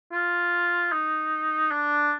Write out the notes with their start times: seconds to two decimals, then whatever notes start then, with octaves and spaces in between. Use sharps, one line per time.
0.12 F4
0.92 D#4
1.71 D4